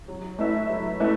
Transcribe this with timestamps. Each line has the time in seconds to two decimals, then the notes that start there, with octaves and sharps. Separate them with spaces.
0.08 F#3
0.39 A3 E4 B4 E5
0.69 F#3
1.00 A3 E4 B4 E5